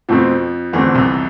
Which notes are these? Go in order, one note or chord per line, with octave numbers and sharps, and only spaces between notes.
F2 B2 F3 A3 C4
E2 D3 E3 A3 C4
C2 C3